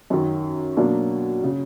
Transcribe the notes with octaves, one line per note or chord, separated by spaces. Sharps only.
F#2 D#3 F#3
B2 F#3 A#3 D4
C#3